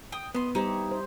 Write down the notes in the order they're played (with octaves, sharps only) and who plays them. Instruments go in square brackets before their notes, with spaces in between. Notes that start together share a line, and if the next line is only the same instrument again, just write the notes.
[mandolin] G5 D#6
[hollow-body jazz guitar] B3 [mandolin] D#5 C6
[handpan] G3 G4 C5 [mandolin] D#4 E4 E5
[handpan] C5